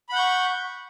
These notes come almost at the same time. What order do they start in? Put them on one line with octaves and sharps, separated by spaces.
B5 F#5 G6 C#6